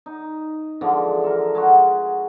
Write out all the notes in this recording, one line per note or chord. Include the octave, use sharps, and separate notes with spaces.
D#4
D3 E3 F3 G#3
A4 A#4
G#3 F#4